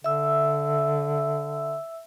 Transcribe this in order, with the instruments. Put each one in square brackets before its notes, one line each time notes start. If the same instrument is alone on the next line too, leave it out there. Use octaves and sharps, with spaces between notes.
[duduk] D3 [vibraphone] E5 E6